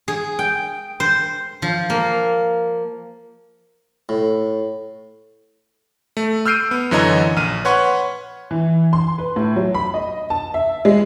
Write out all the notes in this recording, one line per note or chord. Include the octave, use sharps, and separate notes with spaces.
G#4
G5
C5
F3
A#3
A2
A3
E6 F6 G6 C7 D7 D#7
B3
F#2 D3 E3 C#5 D#5 A#5
A#1 F6 D#7
B4 C#5 F#5 C6 C#6
E3
C6
B4
A2
F#3
B5
D#5
A5
E5
G#3